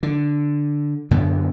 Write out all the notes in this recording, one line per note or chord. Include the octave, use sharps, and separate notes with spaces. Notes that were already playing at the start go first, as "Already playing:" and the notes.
D3
F#2 D3 B3